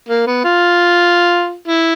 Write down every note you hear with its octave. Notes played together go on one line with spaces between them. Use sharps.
A#3
B3
F4
E4